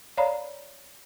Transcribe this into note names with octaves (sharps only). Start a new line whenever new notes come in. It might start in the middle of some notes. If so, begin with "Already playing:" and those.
C#5 D5 F5 A#5 B5